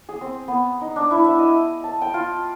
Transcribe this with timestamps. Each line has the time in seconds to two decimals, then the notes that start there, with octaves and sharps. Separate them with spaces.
0.09 G#4
0.21 C4
0.48 B3
0.81 D#4
0.96 D4
1.11 E4
1.24 E5
1.39 D#5
1.84 A5
2.02 G5
2.14 F4